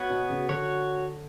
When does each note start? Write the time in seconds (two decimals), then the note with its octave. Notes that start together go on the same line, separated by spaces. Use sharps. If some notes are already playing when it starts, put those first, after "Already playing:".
Already playing: B3 F#4 C#5
0.10 B2
0.30 C#3
0.49 D3 F#4 C#5